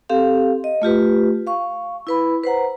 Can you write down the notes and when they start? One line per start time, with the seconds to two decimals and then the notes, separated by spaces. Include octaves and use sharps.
0.09 C4 G4 A4 F5
0.64 D#5
0.82 A3 F4 G4 B4
1.47 F5 C#6
2.07 E4 B4 B5
2.44 B4 C5 F#5 A#5